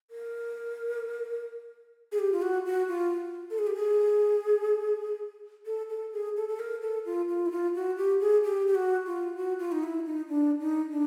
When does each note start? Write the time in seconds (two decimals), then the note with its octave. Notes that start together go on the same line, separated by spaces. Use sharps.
0.11 A#4
2.12 G#4
2.19 G4
2.32 F4
2.42 F#4
2.66 F#4
2.88 F4
3.50 A4
3.59 G#4
3.67 G4
3.75 G#4
5.66 A4
5.89 A4
6.13 G#4
6.36 A4
6.48 A4
6.59 A#4
6.82 A4
7.05 F4
7.28 F4
7.46 E4
7.51 F4
7.75 F#4
7.97 G4
8.20 G#4
8.44 G4
8.67 G4
8.75 F#4
9.06 F4
9.36 F#4
9.59 F4
9.72 D#4
9.83 E4
10.06 D#4
10.29 D4
10.60 D#4
10.91 D4